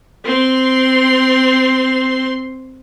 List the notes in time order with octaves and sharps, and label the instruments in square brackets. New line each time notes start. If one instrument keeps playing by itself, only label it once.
[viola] C4 C6